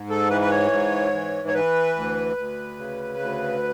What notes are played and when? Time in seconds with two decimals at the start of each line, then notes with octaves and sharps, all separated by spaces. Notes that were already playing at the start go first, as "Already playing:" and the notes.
Already playing: G#2
0.10 A4
0.30 E3 B4
0.41 B4
0.51 C#5
0.71 G#2
1.13 E3
1.48 C#5
1.54 E3 B4
1.96 D2
2.37 D2
2.78 C#3
3.20 D2